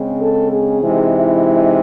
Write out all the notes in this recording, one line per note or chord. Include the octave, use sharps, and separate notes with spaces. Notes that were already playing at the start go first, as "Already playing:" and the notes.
Already playing: C#3 G#3 C4
A4
G#4
C3 E3 G#3 D#4
E4